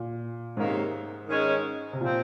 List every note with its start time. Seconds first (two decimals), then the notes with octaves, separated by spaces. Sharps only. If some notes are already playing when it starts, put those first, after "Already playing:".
Already playing: A#2
0.57 G#2 C3 D#3 A#3 C#4
1.29 D#3 G#3 C#4
1.93 C3
2.01 A#2 F3 C4